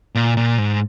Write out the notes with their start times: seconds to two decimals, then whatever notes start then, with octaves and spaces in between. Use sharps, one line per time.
0.15 A#2
0.37 A#2
0.58 G#2